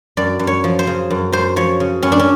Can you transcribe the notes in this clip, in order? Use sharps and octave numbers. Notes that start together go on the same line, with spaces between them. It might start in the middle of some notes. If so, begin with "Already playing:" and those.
F#2 D5
F#2
C#5
F3
C5
C#3
F#2
F#2 C5
F3 C#5
C#3
F#2 C#4
D4
C#4